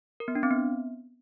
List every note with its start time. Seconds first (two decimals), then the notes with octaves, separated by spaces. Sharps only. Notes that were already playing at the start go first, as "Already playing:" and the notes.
0.20 A#4
0.28 B3
0.35 D4
0.43 C4
0.51 B3